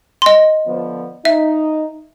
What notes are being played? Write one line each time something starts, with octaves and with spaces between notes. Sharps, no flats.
D#5 C6
D3 F3 B3
D#4 E5